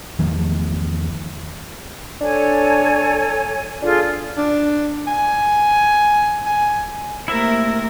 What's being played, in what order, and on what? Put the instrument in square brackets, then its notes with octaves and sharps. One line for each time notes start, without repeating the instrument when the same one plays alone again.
[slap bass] E2 D#3 F3 A3
[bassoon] D4 [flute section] A4 C#5 G#5
[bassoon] D4 [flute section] F4 G#4 A4
[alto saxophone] D4
G#5
G#5
[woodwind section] C3 A3 [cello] A#3 A#4 [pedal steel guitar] E4 E5